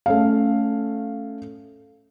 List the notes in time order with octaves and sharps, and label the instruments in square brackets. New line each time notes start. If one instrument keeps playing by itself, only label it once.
[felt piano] A3 C#4 F5